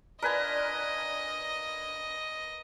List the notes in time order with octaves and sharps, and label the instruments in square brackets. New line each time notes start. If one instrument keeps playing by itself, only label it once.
[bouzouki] D4 F4 [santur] A#4 B4 G#5 [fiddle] D#5